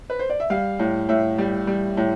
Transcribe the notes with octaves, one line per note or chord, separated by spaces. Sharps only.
B4
C5
D5
E5
G3 F5
A2
A2 E5
G3
G3
A2